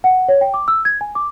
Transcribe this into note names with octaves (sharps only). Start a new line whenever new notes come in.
F#5
C#5
G5
D6
E6
G#6
G#5
D6